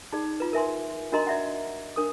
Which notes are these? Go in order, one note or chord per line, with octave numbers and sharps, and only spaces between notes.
D#4 G#4 D5
F4 B4
A#4 E5 G#5 C6
D4 F#4 A#4 D#5 A#5 C6
D5 E5 F#5
D4 A#4 D#6